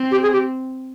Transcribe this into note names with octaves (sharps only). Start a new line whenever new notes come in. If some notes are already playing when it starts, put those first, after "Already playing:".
Already playing: C4
G4
G#4
G4